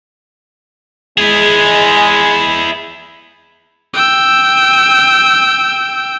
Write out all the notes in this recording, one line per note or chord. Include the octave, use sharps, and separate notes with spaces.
G#3 E4 G#4
G5 E6